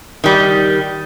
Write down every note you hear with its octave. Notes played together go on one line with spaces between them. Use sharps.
D#3 G3